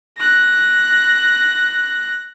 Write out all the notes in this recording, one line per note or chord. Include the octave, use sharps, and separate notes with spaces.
F#6 A#6